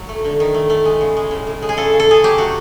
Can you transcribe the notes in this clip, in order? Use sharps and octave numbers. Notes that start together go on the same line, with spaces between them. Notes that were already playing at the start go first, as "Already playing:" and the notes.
Already playing: F#3
A3
D3
D#3
A3
A3
G#3
C#3
G#3
A2
A2
G#3
G#4
C#3 A4
C#3
A4
C#3 G#4
F#3 G4
A3 F#4